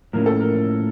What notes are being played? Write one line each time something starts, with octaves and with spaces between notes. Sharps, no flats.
A2 F3 A#3 C#4 A#4
A4
A#4